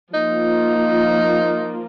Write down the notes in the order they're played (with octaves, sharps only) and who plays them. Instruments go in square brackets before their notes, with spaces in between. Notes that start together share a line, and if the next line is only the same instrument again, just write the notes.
[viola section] F3 A#3 F4 [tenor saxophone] D#4